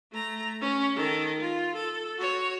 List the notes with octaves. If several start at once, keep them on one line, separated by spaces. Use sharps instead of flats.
A3 A#5
C#4
D#3 A4
F4
A4
F#4 C#5